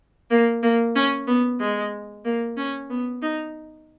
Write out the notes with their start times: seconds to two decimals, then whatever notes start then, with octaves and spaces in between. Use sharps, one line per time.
0.30 A#3
0.63 A#3
0.95 C#4
1.27 B3
1.60 G#3
2.25 A#3
2.57 C#4
2.90 B3
3.22 D#4